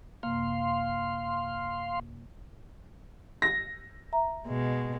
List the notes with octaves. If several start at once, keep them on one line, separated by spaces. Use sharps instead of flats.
F#2 C3 A#3 F5 C6
A#6
E5 A#5
B2 G#3